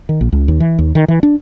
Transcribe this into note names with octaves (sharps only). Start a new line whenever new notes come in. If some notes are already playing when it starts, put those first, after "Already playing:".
D#3
A#1
C#2
D#2
E3
D#2
D#3
E3
D4